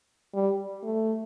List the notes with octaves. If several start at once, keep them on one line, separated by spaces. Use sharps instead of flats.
G3
A3